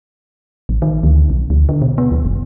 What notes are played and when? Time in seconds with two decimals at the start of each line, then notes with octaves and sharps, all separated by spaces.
0.69 A1
0.82 D#3
1.03 D2
1.30 B1
1.50 D2
1.69 D3
1.82 B2
1.98 B3
2.11 D#2
2.25 F#1